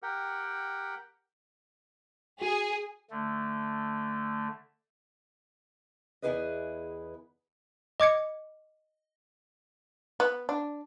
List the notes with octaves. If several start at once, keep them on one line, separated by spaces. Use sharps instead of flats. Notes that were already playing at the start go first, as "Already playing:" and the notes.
G4 A#4 F#5 G5
F#4 G#4
D3 A3
E2 B3 E4 G#4 B4 D#5
D#5 D6 G#6 C#7
B3
D4